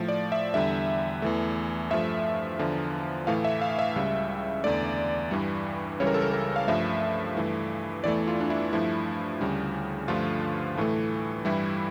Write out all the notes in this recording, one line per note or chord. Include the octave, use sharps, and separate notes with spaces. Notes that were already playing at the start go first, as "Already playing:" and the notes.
Already playing: A2 F3 A3
D5
E5
E2 D3 G3 E5
E2 E3 A3
G2 F3 A3 E5
E2 D3 F3
A2 E3 A3 F5
E5
F5
E5
C#2 C#3 G3
E2 D3 A3 D5
G2 E3 G3
C#2 C#3 E3 G3 C#5
A#4
A4
A#4
A#4
F5
G2 F3 A3 E5
G2 E3 A3
E2 E3 A3 D5
F4
D4
E4
G2 F3 A3 E4
D2 C#3 G3
G2 D3 F3 A3 F4
A2 E3 A3
G2 E3 G3 E4